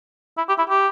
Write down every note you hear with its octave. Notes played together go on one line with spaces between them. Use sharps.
E4
G4
E4
G4